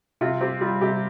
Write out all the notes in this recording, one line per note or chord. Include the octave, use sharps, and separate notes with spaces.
C3 F4
C4 G4
G3 F4
C3 G4